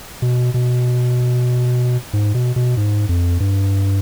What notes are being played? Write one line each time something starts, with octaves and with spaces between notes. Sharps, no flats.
B2
B2
G#2
B2
B2
G#2
F2
G2